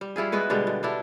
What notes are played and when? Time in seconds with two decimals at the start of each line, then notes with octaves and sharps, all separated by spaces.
0.01 G3
0.16 G3 E4 F4 G#4
0.32 G#3 B3 F#4 B4
0.50 B2 D3 G3 G#3
0.67 B2
0.83 G3 D4 E4